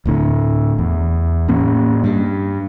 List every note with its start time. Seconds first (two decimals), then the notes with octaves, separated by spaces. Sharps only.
0.06 D1 A2 D3
0.79 E2
1.48 A2 A#3 C#4
2.04 G2